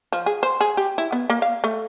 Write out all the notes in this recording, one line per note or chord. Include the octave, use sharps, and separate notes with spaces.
F3
G#4
C5
G#4
G4
E4
B3
A#3
F5
A3